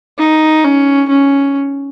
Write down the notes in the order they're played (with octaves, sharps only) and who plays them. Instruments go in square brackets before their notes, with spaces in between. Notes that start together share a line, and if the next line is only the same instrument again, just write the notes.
[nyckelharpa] D#4
C#4
C#4